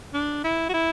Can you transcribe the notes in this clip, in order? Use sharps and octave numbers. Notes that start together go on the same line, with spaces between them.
D4
E4
F#4
E4